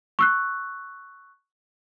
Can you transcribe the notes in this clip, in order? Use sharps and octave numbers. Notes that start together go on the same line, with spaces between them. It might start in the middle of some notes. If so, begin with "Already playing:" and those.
C#6 E6 F#6